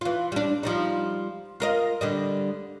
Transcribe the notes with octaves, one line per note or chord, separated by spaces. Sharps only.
E3 F4
G3 D4
F3 G3 D#4
F4 A#4 D#5
D3 G3 D#5